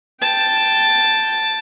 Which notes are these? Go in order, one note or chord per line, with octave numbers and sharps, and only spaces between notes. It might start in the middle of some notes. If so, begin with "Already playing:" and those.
G5 A5